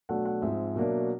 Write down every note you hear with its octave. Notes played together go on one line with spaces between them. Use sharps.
B2 F#3 A3 D4 F#5
F#5
G#2 F3 G#3 C4 E5
B2 F#3 A#3 D4